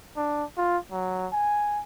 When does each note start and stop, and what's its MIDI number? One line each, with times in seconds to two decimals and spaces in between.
0.17 0.45 62
0.57 0.78 65
0.91 1.27 54
1.32 1.81 80